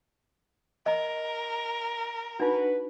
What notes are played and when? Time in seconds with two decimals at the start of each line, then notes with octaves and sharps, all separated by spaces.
0.86 A#4 D#5
2.40 D4 D#4 F#4 B4